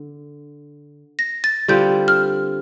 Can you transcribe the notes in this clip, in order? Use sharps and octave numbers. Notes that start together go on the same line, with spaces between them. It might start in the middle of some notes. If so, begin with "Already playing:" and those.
Already playing: D3
A#6
A6
D3 G3 C4 F4 G6
F6